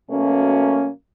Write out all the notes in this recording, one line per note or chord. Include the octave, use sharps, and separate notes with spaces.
B2 F#3 A3 A#3 C#4